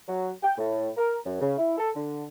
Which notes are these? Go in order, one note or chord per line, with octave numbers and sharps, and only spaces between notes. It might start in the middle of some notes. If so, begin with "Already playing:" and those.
F#3
G5
A2
A#4
F#2
C#3
E4
A4
D3